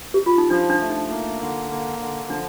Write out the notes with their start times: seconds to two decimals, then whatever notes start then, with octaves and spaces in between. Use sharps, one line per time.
0.14 G4
0.26 F4
0.38 D#4
0.50 F3 D4
0.70 D4
0.80 A3
0.90 D#4
1.10 A#3
1.40 D3
1.70 A#3
1.99 D3
2.29 F3 D4